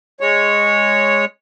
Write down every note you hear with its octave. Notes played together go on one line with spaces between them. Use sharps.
G#3 C#5